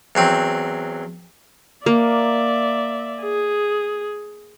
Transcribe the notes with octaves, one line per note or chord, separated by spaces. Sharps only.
E2 F#3 C4
A#3 D5 E5
G#4